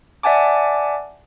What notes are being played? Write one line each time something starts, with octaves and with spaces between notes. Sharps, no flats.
D5 E5 F#5 G#5 A5 D6